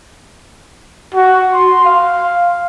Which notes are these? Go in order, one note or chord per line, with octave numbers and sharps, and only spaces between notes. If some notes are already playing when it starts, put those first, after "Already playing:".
F#4
C6
F5